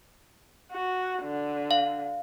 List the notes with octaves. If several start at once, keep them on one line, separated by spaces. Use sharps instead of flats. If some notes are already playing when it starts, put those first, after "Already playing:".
F#4
D3
F5